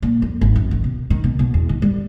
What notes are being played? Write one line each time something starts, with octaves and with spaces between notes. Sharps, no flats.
A#2
F2
G#1
F#2
D#3
B2
D#3
B2
B2
E2
D#3
G3